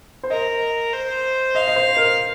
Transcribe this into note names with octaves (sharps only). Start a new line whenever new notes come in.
C5
A#4 D#5
C5
D#5 F5
D#5
C5
A#4